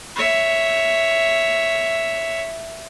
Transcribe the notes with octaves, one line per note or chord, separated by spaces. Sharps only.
C#5 E5